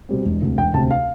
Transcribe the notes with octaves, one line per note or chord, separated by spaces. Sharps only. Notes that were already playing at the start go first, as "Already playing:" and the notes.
B2 G3 C4
E1
D2 C3
E1 G5
D2 C3 A5
F5